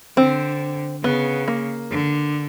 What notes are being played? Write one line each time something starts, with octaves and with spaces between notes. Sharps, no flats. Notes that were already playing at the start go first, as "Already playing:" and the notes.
D3 C4
C#3 B3
A#3
D3